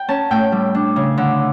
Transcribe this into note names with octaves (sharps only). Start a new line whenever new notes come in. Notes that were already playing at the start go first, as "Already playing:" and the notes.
Already playing: G5
C#4 A5
A2 G5
G3
D4
C#3
D3